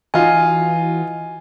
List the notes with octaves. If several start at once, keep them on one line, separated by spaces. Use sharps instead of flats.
E3 D#4 F4 F#4 G#5